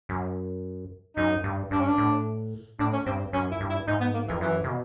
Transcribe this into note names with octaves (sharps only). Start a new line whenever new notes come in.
F#2
F#2 D#4
G2
G2 D4
C#4
D4
A2
A2 D4
C#4
G2 C4
F#2 C#4
E4
G2
E4
G#2 D#4
B3
A#3
F2 E3
F#2 E3
C3
B2